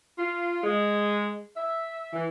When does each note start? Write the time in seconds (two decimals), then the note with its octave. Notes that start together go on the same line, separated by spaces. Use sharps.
0.18 F4
0.64 G#3
1.56 E5
2.13 E3